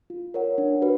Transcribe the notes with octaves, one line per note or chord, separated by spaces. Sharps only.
F4
A#4 C#5 F#5
D4
F#4 B4